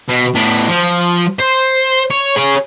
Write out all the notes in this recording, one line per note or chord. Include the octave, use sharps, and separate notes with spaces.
B2
A2 B3
F3
C5
C#5
G#4 C#5